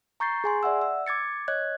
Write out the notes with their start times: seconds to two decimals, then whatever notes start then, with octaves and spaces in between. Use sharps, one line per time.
0.20 A#5 C#6 G6 A6 C7
0.44 G#4 G#5 C6
0.63 D5 E5 F#5 E6
0.82 E6
1.07 D6 G#6 A6 C#7
1.48 C#5 D#5 F#6 G#6